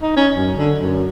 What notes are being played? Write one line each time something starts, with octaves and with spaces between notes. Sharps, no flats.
D#4
C#4
F#2
D3
F#2